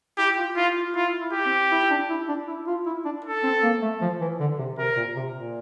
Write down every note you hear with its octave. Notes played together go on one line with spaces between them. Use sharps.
E4 G4
F4
E4 F4
F4
E4 F4
E4
G4
C4
E4
D4
E4
D4
E4
F4
E4
D4
A4
C4
A#3
A3
F3
E3
D3
C3
C3 A#4
A#2
C3
A#2